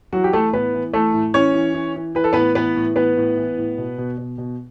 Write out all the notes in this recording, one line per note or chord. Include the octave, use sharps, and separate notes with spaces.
E3 F#3 F#4
G4
E3 A3 A4
A2 B3 B4
E3
E3 A3 A4
A2
E3 C#4 C#5
E3
E3
E3
E3 B4
A4
A2 B3 B4
E3 B3 B4
A2
E3 B3 B4
A2
E3
A2
B2
B2
B2
B2